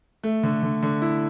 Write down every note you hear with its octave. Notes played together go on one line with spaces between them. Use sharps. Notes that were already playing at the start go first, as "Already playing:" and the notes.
A3
D3
D3
D3
E4